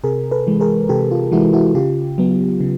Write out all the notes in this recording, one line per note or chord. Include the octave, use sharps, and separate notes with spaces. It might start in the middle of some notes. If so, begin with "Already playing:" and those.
C3 G#4 A#4
A4 B4
E3 G#3
G#4 A#4
C3 G4 A4
F4
E3 G#3 E4 F#4
E4 F#4
C#3 F4 G4
F#3 B3
C#3